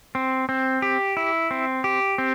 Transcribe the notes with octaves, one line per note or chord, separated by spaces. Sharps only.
C4
C4
G4
E4
C4
G4
C4